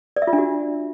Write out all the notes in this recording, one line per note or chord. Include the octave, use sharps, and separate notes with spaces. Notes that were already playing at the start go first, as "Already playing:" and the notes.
D5
E5
F4
D4
F#4